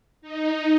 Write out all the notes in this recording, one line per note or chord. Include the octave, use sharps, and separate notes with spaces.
D#4